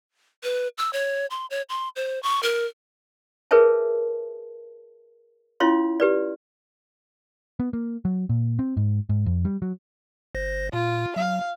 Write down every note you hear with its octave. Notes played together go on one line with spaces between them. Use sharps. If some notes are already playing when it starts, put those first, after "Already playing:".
B4
E6
C#5
C6
C#5
C6
C5
C#6
A#4
G#4 A#4 B4 C#5 E5 A5
C#4 E4 F4 C#5 F5 C6
G4 B4 D5
B3
A#3
F#3
A#2
C4
G#2
G#2
F2
G3
F#3
G1 C5 A#6
A#2 F4
F#3 F5